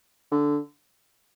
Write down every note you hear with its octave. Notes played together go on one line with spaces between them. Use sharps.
D3